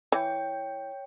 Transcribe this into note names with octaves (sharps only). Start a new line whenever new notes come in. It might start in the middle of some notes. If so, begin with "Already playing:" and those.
E3 C#5 G5